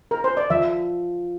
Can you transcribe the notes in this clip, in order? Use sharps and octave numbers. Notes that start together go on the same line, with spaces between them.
A#4
C5
D5
F3 E5